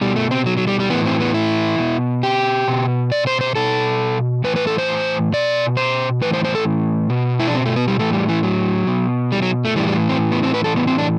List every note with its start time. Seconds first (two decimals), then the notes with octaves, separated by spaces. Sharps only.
0.01 B2 G3
0.16 A3
0.31 C4
0.46 F#3
0.58 F#3
0.68 G3
0.80 G3
0.90 A2 E3 B3
1.05 C4
1.20 B3
1.34 E4
1.78 B2
2.23 G4
2.68 B2
3.12 D5
3.27 C5
3.41 C5
3.56 B2 A4
4.44 A2 E3 B4
4.56 B4
4.67 A4
4.78 C5
5.33 B2 D5
5.77 C5
6.22 A2 E3 B4
6.34 C5
6.44 C5
6.55 A4
7.10 B2
7.40 E4
7.48 D4
7.55 C4
7.66 A3
7.76 B3
7.88 G3
7.99 A2 E3 A3
8.13 G3
8.29 E3
8.43 F#3
8.87 B2
9.32 G3
9.42 F#3
9.65 A3
9.76 A2 E3 G3
9.87 G3
10.09 C4
10.32 B3
10.43 C4
10.54 B4
10.64 A2 E3 A4
10.76 B3
10.87 C4
10.98 D4